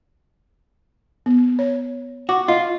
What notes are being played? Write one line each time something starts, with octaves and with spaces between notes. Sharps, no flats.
B3
C#5
F#4 D6
F4 D#5